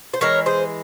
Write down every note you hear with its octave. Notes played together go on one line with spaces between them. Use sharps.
C5
E3 G#3 A#4 C#5
G#4 C5